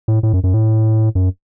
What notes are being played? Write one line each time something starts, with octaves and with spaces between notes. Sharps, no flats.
A2
A2
F#2
F#2
A2
F#2